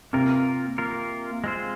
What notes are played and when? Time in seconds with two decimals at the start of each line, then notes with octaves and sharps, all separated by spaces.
0.13 C3 A#3 F4 A#4
0.78 A#3 F4 A#4
1.44 G#3 C4 F4 C5